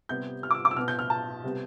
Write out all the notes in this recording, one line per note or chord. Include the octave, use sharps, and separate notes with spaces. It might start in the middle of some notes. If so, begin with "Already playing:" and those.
C3 G3 B3 G6
F6
D6
E6
D6
E6
B2 B3 F6
G6
F6
A5
C3 G3 B3